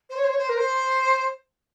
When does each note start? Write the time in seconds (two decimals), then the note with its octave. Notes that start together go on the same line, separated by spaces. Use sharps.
0.10 C5
0.17 C#5
0.24 C5
0.31 C#5
0.38 C5
0.49 A#4
0.57 C5